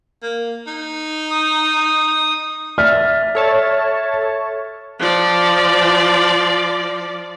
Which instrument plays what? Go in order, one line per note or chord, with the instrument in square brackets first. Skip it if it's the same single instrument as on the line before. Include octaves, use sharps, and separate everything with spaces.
[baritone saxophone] A#3
D#4
[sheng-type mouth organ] D#6
[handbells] D5 E5 [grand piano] F6
[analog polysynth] A4 C#5 A5 [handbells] E5
[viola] F3 D5